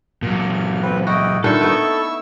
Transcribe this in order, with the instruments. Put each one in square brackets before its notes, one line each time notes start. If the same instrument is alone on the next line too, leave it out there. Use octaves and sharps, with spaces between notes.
[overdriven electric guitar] A#2 F#3 [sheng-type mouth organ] F6
[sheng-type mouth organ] C4 B4
[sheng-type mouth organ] E4 D#5 G5 [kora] F#4
[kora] A#2 D3 D#3 [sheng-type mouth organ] E4 C#6 E6 [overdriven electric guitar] A4
[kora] A3 B3 D#4